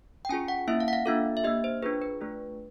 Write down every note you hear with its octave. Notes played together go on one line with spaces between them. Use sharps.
G5
C#4 F4 G#4 G#5
F#5
A#3 C#4 E4 E5
F5
F#5
F5
A#3 D4 F4 A4 E5
E5
A#3 D4 G4 D#5
C5
D4 F4 G#4 B4
B4
A3 D4 F4 G#4